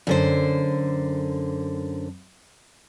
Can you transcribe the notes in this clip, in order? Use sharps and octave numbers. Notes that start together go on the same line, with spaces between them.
F#2 D3 C5